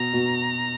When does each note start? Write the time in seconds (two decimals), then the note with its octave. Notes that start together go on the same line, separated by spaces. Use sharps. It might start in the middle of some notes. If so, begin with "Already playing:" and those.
Already playing: B2 A#5
0.13 B2